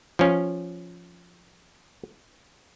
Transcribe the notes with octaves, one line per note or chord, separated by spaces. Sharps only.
F3 C#4